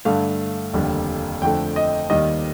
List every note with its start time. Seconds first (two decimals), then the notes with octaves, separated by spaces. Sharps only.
0.05 G2 D3 A3 F5
0.73 F1 D#2 D3 G3
1.42 F2 D3 A3 G5
1.76 D#5
2.10 D#2 D#3 G3 D#5